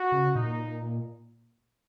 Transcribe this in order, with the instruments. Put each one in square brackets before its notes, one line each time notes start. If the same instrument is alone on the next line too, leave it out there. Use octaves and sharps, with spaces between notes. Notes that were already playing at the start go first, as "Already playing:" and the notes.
Already playing: [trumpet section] F#4
[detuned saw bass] C#3
[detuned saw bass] A#2 [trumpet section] D#4